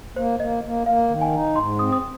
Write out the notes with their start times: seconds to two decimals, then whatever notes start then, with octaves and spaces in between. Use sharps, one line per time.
0.16 A#3 C5
0.39 A#3 D#5
0.64 A#3
0.86 A#3 F5
1.09 D#3
1.21 G#5
1.33 D#4
1.56 G#2 C6
1.79 C4 D#6
1.92 D#6